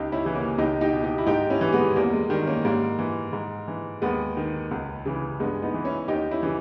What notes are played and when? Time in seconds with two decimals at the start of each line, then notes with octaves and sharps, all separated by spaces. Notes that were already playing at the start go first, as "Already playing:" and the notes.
Already playing: C#2 D#4 G4
0.12 C#4 E4
0.24 C#3 E3
0.35 A#3 C#4
0.58 C#2 D#4 G4
0.81 D#4 G4
0.92 B2
1.04 D#4 G4
1.18 E4
1.26 G#2 D#4 G4
1.50 C#4 E4
1.61 E3
1.73 G#3 B3
1.96 E2 G3 A#3
2.13 G#3
2.30 D#3 G3
2.47 A#3 C#4
2.65 G#2 G3 A#3
2.99 E3
3.33 G#2
3.68 E3
4.02 D#2 G#3 B3
4.37 D#3
4.71 C#2
5.05 C#3 E3
5.40 G2 G#3 B3
5.62 B3 D#4
5.74 E3
5.85 C#4 E4
6.08 D#2 D#4 G4
6.31 C#4 E4
6.43 C#3 E3